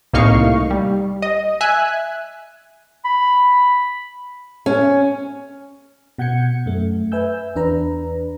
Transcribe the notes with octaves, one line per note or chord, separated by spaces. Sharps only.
C2 A2 A#3 D#4 F5 C#6
G3
D#5
E5 G#5 F#6
B5
C#4
B2 F#5 G6 G#6 C#7
F#2 A3
B4 E5 G#5 E6 G6
E2 D4 B4 A#5